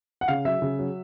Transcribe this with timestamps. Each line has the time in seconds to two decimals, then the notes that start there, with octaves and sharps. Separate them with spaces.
0.21 F#5
0.28 C#3 F5
0.45 F#3 E5
0.62 C#3
0.79 F#3